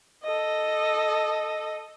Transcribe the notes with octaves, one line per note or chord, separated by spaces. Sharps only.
A4 D#5